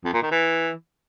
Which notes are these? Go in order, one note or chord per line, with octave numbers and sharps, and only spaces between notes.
F2
A#2
D#3
E3